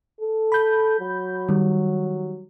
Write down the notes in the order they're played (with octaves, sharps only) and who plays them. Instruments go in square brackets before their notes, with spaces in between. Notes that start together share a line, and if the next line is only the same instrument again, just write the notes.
[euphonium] A4
[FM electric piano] B5 G6
[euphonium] F#3
[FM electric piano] D#3 G3